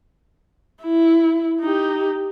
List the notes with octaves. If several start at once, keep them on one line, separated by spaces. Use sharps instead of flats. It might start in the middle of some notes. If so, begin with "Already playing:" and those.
E4
D#4 G4